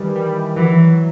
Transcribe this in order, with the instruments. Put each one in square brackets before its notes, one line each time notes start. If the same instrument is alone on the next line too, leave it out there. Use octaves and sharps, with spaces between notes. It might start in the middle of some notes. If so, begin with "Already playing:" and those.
Already playing: [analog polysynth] D#3 E3 G3
G3
[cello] E3 [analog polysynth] F#3